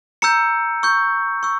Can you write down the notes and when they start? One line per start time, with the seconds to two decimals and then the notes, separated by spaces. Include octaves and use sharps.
0.22 A#5 E6 G6 C#7
0.83 C#6 E6 G6
1.43 C#6 E6